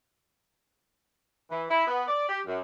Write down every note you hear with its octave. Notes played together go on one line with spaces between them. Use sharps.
E3
E4
B3
D5
G4
F#2